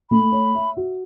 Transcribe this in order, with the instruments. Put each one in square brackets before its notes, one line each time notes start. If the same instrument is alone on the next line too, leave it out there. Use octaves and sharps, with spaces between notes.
[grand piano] A3 [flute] B5
[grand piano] C#5
E5
F#4